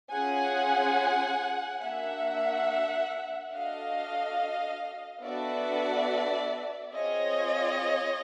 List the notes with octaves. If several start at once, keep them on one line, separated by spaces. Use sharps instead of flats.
C#4 F4 G#4 F#5 G#5
A#3 D4 F#4 E5 F#5
D4 F#4 A4 D#5 F5
B3 D4 F#4 A4 D5 E5
C4 F4 G#4 C#5 D#5